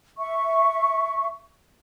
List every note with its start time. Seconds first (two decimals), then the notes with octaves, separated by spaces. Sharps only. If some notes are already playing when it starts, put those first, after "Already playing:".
0.19 E5 C#6